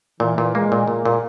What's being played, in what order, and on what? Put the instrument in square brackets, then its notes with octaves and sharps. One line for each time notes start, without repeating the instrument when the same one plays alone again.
[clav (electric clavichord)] A#2 [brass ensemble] E3
[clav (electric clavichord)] A#2
[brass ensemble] G#3 [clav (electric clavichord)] A#3
[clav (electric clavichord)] A#2
[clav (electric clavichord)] A#2 [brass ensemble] A#3
[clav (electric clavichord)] A#2